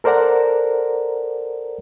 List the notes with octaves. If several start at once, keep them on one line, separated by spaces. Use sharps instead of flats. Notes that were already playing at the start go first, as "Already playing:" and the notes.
A4 A#4 C5 D5 F#5 A#5